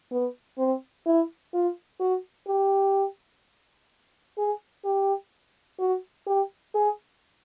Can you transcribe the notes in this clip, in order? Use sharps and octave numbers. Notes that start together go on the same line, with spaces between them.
B3
C4
E4
F4
F#4
G4
G#4
G4
F#4
G4
G#4